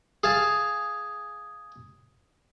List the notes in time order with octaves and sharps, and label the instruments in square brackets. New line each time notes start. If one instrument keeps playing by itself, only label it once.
[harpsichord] G#4 F5 A5